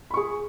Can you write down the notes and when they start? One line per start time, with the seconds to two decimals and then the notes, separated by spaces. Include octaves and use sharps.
0.11 B5
0.14 C#6
0.17 G#4